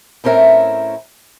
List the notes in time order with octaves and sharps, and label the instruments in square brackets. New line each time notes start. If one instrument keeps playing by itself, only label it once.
[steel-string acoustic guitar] A2 C4 C#4 A#4 E5